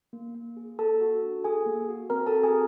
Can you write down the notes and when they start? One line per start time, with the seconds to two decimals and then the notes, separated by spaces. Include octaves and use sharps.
0.13 A#3
0.35 A#3
0.57 G#4
0.78 A#3 A4 A5
1.01 F#4
1.22 D4
1.44 G#4 A4 G#5
1.66 A#3
1.89 F#4
2.10 C4 A#4 A#5
2.26 A4 A5
2.32 F#4
2.43 G#4 G#5